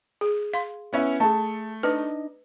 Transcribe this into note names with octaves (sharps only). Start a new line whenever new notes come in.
G#4
F5 C6
B3 C#4 E4
A3 G#4 A5
D4 D#4 B4 D#5